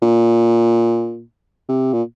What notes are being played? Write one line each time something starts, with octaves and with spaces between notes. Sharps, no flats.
A#2
C3
A#2